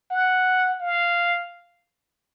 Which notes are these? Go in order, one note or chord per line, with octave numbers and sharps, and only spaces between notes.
F#5
F5